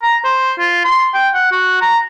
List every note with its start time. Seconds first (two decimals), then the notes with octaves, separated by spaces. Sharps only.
0.03 A#5
0.24 C5
0.59 F4
0.85 C6
1.14 G5
1.34 F#5
1.52 F#4
1.81 A#5